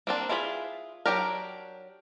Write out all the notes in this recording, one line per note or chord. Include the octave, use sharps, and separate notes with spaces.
A#3 C4 D4
E4 F4 G#4 C#5 B5
F#3 G#3 D4 G4 A#4